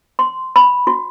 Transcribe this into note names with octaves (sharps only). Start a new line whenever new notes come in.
C6
B5
F#4